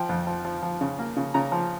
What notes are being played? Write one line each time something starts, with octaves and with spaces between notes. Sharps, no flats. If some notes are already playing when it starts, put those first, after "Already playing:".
Already playing: F3 G5
F2
F3
F3
F3
C#3
A#3
C#3
C#3 A#5
F3